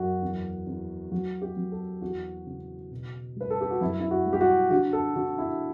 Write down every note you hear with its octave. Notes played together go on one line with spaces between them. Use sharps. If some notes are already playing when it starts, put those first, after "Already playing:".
Already playing: F#2 F#4
E2
E2
F#3 F#4
G4
F#3
A4
E2 F#4
C#3
B2
G3 B4
A4
G4
F#4
F#2 E4
E4
F#4
G3
G4
F#4
D3 F#4
A4
D3 F#4
E4